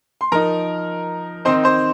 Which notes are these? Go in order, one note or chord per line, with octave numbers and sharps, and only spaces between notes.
C6
F3 D#4 A#4 A#5
D#3 C4 D#4 C5 C6
C5 C6